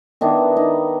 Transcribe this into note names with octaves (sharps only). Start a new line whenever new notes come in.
D#3 B3 D4 E4
D#4